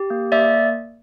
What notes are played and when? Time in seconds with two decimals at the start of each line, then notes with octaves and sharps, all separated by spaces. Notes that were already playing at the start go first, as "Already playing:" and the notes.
Already playing: G4
0.10 A#3
0.32 A#3 D5 E5